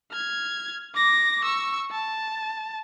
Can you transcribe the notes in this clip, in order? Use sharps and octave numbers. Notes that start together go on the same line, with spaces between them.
F6 G#6
D6 A#6
C#6 E6
A5